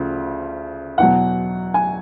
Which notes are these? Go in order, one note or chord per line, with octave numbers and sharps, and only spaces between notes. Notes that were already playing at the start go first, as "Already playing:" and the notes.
Already playing: D2 C#3 F3
E2 B2 F#3 F#5
G#5